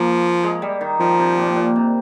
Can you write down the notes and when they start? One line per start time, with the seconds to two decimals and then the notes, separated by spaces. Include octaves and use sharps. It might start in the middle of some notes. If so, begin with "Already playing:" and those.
Already playing: F3 A#3
0.43 G#3
0.62 G3
0.81 D#3
1.00 D#3 F3
1.19 C3
1.37 A#2
1.56 A#2
1.76 C3